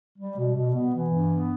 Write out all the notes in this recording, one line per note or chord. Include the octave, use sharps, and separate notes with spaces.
G3
B2
B2
B3
E3
G2
B3